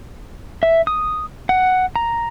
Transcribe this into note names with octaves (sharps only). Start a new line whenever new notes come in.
E5
D#6
F#5
A#5